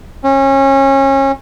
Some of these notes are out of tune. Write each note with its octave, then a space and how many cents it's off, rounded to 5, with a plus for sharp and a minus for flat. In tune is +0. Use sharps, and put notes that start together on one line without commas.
C#4 -30